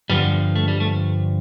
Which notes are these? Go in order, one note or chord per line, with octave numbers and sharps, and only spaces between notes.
G2 D3 F3 G3 B3
A3
G3
A3